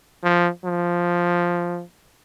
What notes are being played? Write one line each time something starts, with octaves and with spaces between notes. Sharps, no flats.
F3
F3